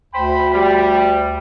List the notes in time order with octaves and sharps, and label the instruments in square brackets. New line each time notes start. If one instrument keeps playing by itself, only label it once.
[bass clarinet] D2 [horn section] C5 G5 B5
[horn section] G3